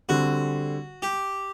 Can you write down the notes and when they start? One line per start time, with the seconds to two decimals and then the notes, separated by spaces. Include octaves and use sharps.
0.09 D3 G3 C4 F#4
1.02 G4